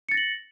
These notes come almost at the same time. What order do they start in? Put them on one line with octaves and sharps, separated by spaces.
C#7 A6 A#6 F#7